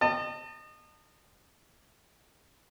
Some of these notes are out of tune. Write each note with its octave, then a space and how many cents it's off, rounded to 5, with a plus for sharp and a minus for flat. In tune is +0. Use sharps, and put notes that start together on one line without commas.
D#5 -30 A5 +30